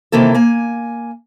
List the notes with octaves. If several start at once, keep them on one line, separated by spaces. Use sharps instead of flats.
C3 D#3 E3 A#3 A4
A#3 G#5